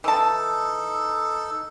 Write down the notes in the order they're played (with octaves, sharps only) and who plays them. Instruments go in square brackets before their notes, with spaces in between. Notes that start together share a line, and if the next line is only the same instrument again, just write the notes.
[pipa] E3 A5 [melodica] D#4 A4